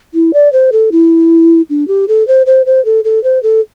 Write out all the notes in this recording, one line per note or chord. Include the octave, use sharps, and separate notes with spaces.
E4
D5
C5
A4
E4
D4
G4
A4
C5
C5
C5
A4
A4
C5
A4